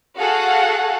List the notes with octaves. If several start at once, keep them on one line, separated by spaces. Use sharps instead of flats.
F#4 G#4 A4 F5 F#5